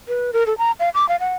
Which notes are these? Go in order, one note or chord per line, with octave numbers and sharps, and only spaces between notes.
B4
A#4
A4
A#5
F5
D6
F5
F#5